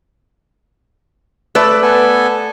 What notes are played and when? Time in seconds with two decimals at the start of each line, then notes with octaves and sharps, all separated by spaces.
1.55 A3 B4 D5
1.83 B3 A4 G#5